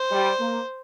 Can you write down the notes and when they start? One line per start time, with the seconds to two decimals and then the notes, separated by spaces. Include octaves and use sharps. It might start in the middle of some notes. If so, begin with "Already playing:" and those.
Already playing: C5
0.11 G3
0.40 A#3